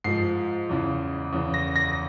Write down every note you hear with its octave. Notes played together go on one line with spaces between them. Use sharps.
G#2 F3 C7
E2 C#3 E3
E2 C#3 E3
A#6
A#6